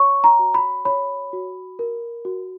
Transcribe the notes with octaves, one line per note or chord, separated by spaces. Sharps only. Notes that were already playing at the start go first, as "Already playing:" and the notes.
Already playing: C#5 C#6
A#5
F#4
B5
C#5 B5
F#4
A#4
F#4